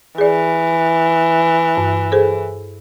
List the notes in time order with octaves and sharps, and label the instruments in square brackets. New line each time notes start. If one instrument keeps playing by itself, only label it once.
[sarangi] E3 [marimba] G#4 D5
[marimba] G2
G#4 A4 C5